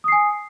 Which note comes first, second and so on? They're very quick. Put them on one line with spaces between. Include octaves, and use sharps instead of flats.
D#6 C7 G#5